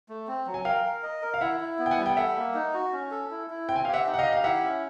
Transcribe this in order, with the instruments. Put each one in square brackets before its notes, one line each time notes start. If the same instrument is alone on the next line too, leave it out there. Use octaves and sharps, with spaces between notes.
[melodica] A3
C4
F#3
[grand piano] G#5
[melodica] A#4 [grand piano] F5 G5
[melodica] A#4
D#5
A#4
[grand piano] F5
[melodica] E4 [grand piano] E5 F#5
[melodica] E4
B3
[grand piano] G5
F#5 G#5
[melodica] G3
[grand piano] G5
[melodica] A4 [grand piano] E5 F#5
[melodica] A#3
D#4
F#4
C#4
A4
E4
E4
[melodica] C4 [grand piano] G5
[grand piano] G#5
[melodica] G4 [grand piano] F5 G5
[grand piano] E5 F#5
[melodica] D#4
[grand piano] F#5
D#5 F5
[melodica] G4
[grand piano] F5
[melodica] E4 [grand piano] E5 F#5
[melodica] C#4